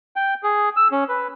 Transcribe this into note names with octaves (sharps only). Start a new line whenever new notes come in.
G5
G#4
E6
C#4
B4